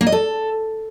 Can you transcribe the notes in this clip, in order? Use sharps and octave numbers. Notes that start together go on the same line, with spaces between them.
A#3
D#5
A4